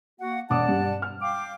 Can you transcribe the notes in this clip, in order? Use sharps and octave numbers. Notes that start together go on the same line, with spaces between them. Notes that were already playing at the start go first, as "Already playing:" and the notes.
A#3 F#4 F#5
E1 D5 F#5 A5 D6 D#6
G2
F6
F5 G5 D6